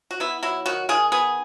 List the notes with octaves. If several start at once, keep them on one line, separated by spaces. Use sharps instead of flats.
F#4
B3 E4
F#3 E4
D#3 F#4
D#3 G#4
B3 G#4